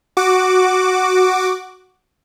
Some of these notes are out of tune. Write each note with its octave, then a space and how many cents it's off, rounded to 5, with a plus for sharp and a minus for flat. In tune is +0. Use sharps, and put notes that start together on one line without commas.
F#4 +0 D6 +0